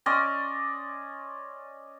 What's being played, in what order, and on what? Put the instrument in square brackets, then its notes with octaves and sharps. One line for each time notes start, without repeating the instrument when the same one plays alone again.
[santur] C#4 D5 D#5 C6